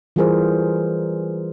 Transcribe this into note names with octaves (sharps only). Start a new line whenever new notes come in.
E3 G3 F4 G#4 A#4 C5